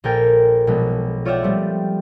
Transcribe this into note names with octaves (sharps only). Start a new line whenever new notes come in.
A#1 A4 A#4 G5 G#5
B1 B2 F3 G#3
F4 C#5 D5 E5 F#5 G5
F3 G3 A3 C4